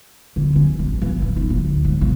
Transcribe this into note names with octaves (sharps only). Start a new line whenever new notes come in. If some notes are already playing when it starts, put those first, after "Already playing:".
D3
C#4
A1
E3
A2
D#4
D2
G#1
C3